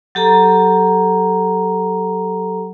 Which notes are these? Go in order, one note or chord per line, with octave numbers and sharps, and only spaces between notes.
F#3 G4 A4 A#5